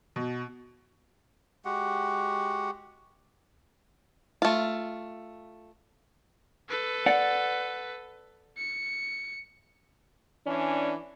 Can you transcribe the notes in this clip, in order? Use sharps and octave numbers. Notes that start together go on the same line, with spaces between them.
B2
G#3 F#4 G4 F#5
A3 F4
A4 B4
D5 F#5
C#7
E3 C#4 D4 D5